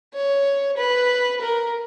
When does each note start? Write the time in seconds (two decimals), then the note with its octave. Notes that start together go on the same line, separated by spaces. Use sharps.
0.14 C#5
0.77 B4
1.41 A#4